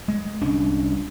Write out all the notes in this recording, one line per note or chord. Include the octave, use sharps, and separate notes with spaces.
G#3
C2 C#4 D4